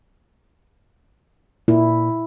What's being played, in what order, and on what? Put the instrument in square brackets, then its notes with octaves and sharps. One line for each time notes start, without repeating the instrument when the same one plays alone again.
[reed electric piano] A#2 [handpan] E4